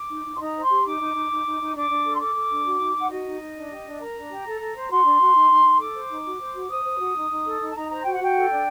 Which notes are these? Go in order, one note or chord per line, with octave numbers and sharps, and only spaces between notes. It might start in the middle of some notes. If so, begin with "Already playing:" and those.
Already playing: D6
D#4
D#4
C6
D#4 A#5
C5
C6
G4
D#4 D6
D#4
D#4
D#4
D#4
D#4
D4 D6
D4
A4
C6
A4 D6
A4
D4
F#4
D#4
D#4
F#5
F#4 D#5
D#4
D#4
D4
G4
D4
A#4 A#5
D4
G4
A4
A4
C5
F#4 C6
D4
F#4
D#4
D#4
D#4
A4 D6
C5
D#4
F#4
C5
F#4
C5 D#6
C5
F#4
D#4
D#4
A4
D#4
A5
D#4 A#5
C5 A#5
F#4 G5
F#5
F#4 G5
A4
D4